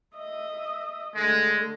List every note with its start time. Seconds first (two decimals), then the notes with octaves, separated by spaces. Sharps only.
0.17 D#5 E5
1.15 D3 G#3 A3